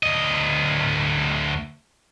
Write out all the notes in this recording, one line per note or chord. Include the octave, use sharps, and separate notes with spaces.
D2 D#5